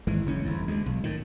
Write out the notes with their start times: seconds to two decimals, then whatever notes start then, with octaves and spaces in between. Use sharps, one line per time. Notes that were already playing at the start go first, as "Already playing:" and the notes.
0.07 G#1 E3 G#3
0.26 F#1 E2 E3 C#4
0.45 G1 F2
0.67 D2 G#3
0.86 B1
1.04 A2 D#3